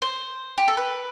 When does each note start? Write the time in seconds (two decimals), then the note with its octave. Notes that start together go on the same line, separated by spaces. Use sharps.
0.02 C5
0.58 G4
0.68 A4
0.77 B4